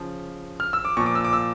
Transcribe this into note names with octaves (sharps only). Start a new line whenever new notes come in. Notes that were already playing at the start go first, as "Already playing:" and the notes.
Already playing: C#3 F3
F6
E6
D6
A#2 F3 C#6
D6
E6
D6
E6